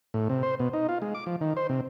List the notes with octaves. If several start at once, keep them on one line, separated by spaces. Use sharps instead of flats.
A2
C3
C5
B2
D#4
F4
G#3
D6
F3
D#3
C5
C3